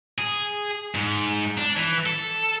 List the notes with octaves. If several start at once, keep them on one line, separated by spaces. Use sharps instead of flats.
G#4
G#2
D4
E3
A4